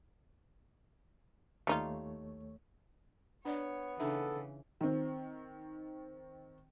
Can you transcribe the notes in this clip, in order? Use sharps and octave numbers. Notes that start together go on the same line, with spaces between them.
D#2 G3 A3 D#4 F4 C#5
B3 D4 C#5 D5 F#5
C#3 E3 D4 D#4 A4 E5
D#3 C4